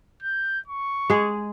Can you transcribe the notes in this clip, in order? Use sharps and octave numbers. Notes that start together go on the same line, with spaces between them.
G6
C#6
G#3 G#4